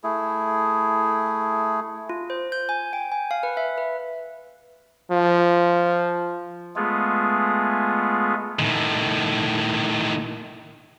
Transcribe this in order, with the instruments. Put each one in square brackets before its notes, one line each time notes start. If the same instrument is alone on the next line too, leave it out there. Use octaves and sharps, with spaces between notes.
[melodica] A3 E4 G#4
[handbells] F4
C5
G6
G#5
G5
G#5
F5
B4
E5
B4
[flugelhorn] F3
[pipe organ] G#3 A3 B3 F4 G#4
[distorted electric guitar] A2 D#3